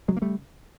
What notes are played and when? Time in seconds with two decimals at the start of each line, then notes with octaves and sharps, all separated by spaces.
0.08 C#3 F#3 G#3
0.17 A#3
0.22 G3 A3